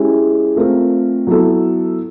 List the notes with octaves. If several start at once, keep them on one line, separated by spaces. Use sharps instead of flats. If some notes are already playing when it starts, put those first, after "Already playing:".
Already playing: G#3 C#4 E4 G4
A3 C4 F4 A#4
F#3 B3 E4 A4